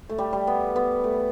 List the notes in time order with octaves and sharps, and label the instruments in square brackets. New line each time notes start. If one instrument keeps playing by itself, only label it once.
[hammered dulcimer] A3
G3
G3
B3
B3
A3